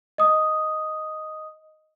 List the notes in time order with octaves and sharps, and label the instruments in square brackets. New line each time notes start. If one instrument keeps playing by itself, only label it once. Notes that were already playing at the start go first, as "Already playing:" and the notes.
[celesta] D#5 D#6